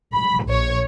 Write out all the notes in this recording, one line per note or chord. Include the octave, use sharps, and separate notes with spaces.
B5
A#1 C#5